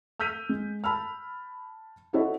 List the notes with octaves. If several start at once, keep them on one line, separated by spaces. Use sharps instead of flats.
E6 F6 G6 B6 D#7
G#3
A5 B5 E6 F6
E4 F#4 A4 C5 C#5 D#5